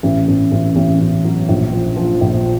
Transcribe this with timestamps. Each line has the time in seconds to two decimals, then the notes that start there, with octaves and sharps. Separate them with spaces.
0.03 A1
0.28 A1
0.52 A1
0.76 A1
1.01 A1
1.25 F#3
1.49 A#1
1.72 F3
1.97 F3
2.21 A#1